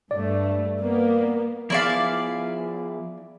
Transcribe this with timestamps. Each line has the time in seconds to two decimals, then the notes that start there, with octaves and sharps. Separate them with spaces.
0.11 G2 A3 D5
0.82 A#3 B3
1.70 F3 B3 E4 G#4 D5 F5